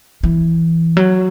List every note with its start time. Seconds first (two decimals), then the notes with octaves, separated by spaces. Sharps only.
0.23 E3
0.97 F#3